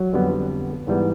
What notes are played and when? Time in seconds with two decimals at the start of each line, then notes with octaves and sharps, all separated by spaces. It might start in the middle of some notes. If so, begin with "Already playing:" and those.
Already playing: F#3
0.13 F2 D3 G3 B3
0.87 G#2 E3 G3 B3